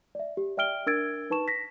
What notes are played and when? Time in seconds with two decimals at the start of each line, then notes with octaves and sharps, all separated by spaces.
0.15 D5 E5
0.37 G4
0.57 D5 E5 G5 F6 D7 G7
0.86 D4 A#4 E6 G#6 A6 D7
1.30 D#4 B4 A5 C#6 E7
1.48 A#6 B6